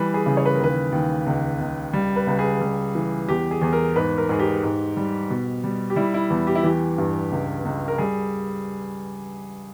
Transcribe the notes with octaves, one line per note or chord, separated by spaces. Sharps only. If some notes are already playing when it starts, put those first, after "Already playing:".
Already playing: E3 G3 B4
G#4
C#3
C#5
B4
A#4
D#2 B4
D#2
C#2
C#2
G3
B4
C#2
G#4
G3
E3
E2 G4
G#4
E2 G#4
A#4
G#2 B4
A#4
G#2 G#4
G4
G#2
G3
B2
G3
G4
G3 E4
E4
E2
G4
E4
E3 G4
G2
C#2
C#2
A#4
G3 G#4